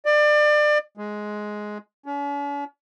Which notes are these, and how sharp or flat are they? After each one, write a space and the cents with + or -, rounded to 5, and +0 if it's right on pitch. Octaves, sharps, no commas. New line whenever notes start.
D5 +30
G#3 +10
C#4 +45